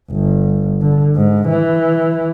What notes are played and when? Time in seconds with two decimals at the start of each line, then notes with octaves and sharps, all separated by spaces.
0.12 G1
0.81 D3
1.15 G#2
1.49 E3